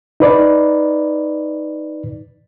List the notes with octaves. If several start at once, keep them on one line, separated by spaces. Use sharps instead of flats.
D#4 B4 D5